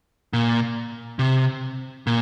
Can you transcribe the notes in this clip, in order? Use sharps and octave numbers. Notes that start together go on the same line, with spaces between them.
A#2
C3
A#2